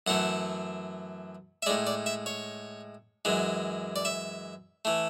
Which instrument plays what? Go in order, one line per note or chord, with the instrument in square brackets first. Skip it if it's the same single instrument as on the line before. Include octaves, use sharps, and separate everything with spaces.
[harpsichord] F#2 E3 A3 F#5
E5
G#3 D5
A2
D5
E5
C#5
F#2 E3 G#3
D5
E5
E3 A3